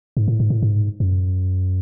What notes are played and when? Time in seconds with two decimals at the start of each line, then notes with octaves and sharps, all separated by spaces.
0.17 G#2
0.28 A2
0.40 G#2
0.50 A2
0.62 G#2
1.00 F#2